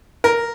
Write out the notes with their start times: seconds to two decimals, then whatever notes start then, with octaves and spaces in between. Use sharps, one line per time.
0.24 A#4